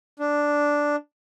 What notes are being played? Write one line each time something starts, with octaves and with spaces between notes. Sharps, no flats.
D4